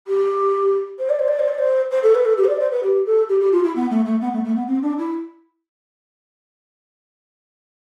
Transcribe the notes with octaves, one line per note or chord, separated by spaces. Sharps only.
G4
C5
D5
C5
D5
C5
D5
C5
C5
A4
B4
A4
G4
C5
D5
C5
B4
G4
A4
G4
G4
F4
E4
B3
A3
A3
B3
A3
A3
B3
C4
D4
E4